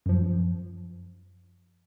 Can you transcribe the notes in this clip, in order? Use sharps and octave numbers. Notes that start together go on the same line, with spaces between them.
F#2 F3